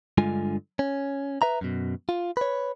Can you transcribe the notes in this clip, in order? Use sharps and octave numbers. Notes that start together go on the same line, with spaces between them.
G2 D3 G#3 F4 G#5
C#4
B4 E5 A#5
F#2 B2
F4
B4 C#5